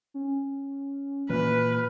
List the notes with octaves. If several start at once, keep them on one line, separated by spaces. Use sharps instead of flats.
C#4
A#2 E3 B4 F6